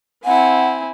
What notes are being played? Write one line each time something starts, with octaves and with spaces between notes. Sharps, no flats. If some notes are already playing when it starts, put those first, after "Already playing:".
C4 E4 F#5 G#5